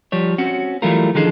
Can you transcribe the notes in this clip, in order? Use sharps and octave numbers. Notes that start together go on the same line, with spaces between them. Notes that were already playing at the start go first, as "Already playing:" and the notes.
F3 G3 C#5
C4 C#4 F#4
E3 F#3 G3 A3 F4 A#4
D#3 F3 D4 D#4 G#4 A4